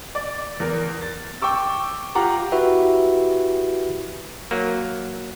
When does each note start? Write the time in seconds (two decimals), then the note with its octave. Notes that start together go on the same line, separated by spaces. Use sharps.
0.15 D5
0.60 E2 A#4
1.01 A6
1.42 G5 C#6 D6 E6
2.15 F4 G4 F#5 A#5 D6
2.52 E4 F#4 G4 B4 E5
4.51 F#3 A#3